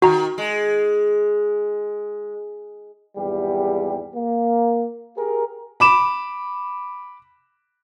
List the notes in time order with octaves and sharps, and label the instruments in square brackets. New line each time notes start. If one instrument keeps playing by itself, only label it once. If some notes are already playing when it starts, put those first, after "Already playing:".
[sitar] D#3 [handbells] F#4 A#5
[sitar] G#3
[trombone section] G#1 E2 G3 G4
A#3
G4 G#4 A#4
[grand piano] B5 D6 E7